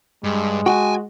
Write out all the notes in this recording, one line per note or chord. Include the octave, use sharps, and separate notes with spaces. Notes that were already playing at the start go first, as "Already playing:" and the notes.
G2 G#3
F#4 G5 G#5